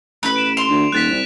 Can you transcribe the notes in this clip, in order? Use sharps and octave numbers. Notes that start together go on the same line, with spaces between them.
A1 B4 B5
D7 E7
C6 F7
D2
D#1 F#6 A6 B6
C2